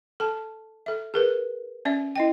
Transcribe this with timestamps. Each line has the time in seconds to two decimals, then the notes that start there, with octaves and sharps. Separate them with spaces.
0.20 A4 A5
0.86 A4 E5
1.14 G#4 A#4 B4
1.85 C#4 D5 E5
2.16 E4 D#5 G5